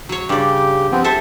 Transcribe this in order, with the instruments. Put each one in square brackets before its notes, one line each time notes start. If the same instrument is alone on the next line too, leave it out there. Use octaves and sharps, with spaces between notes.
[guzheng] F#3 C#5
[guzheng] G2 D5 [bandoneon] C#3 G4
[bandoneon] F3 B3 C4
[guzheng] A4 C5 E5 [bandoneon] A5